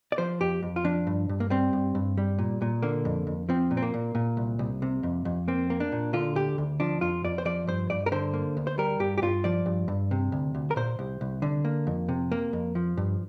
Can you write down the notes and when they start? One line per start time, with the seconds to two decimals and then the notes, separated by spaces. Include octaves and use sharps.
0.12 D5
0.18 F3 C5
0.40 F2 G4
0.63 F2
0.76 F4
0.84 F3 D4
1.07 G2
1.29 G2
1.40 A#3
1.50 G3 C4
1.73 G2
1.95 G2
2.17 G3
2.39 A#2
2.62 A#2
2.82 D3 A#3
3.05 F2
3.27 F2
3.49 F3 C4
3.71 A#2
3.77 C4
3.82 A#3
3.94 A#2
4.15 A#2
4.37 C2
4.59 C2
4.82 C3
5.03 F2
5.25 F2
5.48 A#3 C4
5.70 A#3
5.80 D4
5.92 A#2
6.13 D3 F4
6.35 D2 G4
6.58 D2
6.80 F3 D4
7.01 F2 F4
7.25 F2 D5
7.38 C5
7.45 F3 D5
7.67 G2 C5
7.90 G2 D5
8.06 A#4
8.12 D3 C5
8.34 A#3
8.57 D2
8.67 C5
8.78 G3 A#4
9.00 G2 G4
9.18 G4
9.22 G2 F4
9.44 F3 D5
9.66 G2
9.88 G2
10.11 C3
10.32 D2
10.55 D2
10.71 A#4
10.76 A#2 C5
10.99 C2
11.21 C2
11.42 D3
11.65 A#3
11.87 F2
12.09 C3
12.32 A#3
12.53 F2
12.75 F3
12.97 G2